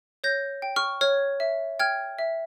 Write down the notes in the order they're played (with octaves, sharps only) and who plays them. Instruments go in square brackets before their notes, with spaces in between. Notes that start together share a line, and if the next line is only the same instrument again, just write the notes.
[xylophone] C#5 G6 A#6
G5
C#6 F6
C#5 F6 G#6
E5
G5 F6 G#6
E5